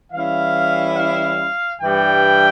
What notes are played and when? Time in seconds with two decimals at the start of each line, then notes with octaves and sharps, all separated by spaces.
0.12 E3 G3 C#4 E4 F5
0.96 F5
1.80 G2 E3 G3 G5